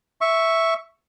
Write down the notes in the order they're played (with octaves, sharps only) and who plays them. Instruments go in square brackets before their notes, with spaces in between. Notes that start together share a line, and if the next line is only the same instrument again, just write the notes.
[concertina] E5 C#6